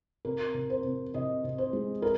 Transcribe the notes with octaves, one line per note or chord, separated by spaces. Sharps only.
C3 A#4
C3
C5
C3
C3 D#5
C3
C5
G#3
A#4